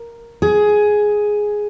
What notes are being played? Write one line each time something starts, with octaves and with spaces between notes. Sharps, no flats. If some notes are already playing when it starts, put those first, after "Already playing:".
Already playing: A#4
G#4